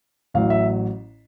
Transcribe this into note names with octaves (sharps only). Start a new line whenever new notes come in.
A1 A2 F#3 F5
E5